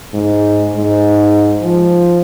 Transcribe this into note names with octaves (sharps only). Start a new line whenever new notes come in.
G#2
G#2
F3